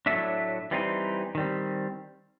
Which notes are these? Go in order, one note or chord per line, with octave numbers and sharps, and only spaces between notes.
A2 F#3 A3 D4 E5
E3 G3 C4 D#4
D#3 G3 C4